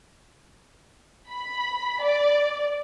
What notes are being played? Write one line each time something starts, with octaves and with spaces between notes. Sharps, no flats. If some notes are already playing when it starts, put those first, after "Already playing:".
B5
D5